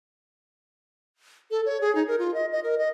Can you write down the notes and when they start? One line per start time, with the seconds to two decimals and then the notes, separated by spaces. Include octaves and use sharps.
1.51 A4
1.66 C#5
1.81 G#4
1.95 D#4
2.08 A#4
2.19 F4
2.34 D#5
2.52 D#5
2.64 A#4
2.78 D#5